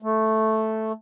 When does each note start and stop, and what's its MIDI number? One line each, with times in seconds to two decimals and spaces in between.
0.02 0.92 57